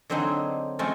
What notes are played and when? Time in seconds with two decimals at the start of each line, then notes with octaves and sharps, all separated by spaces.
0.10 D3 F#3 C4 D4 D#4 G#4
0.79 F3 G#3 A3 C4 C#4